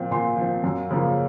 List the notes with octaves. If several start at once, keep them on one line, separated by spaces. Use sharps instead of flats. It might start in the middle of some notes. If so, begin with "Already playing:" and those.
Already playing: A#2 F3 C4
A#2 C6
F3 C4
F#2
C#3 F3 A#3 C#4